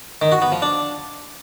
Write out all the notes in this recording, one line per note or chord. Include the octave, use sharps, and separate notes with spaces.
D#3
F#4
B3
F3
D4